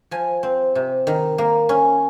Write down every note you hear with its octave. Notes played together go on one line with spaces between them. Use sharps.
F3 G#5
C4
C3
D#3
A#3
C#4